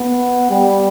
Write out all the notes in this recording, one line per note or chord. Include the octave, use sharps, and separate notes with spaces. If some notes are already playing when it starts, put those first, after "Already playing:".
Already playing: B3
G3